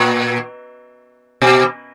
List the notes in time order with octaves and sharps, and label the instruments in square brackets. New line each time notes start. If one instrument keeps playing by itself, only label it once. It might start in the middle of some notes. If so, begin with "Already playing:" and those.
Already playing: [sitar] A#2
B2